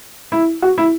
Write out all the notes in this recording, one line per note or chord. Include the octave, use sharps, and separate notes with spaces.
E4
F#4
E4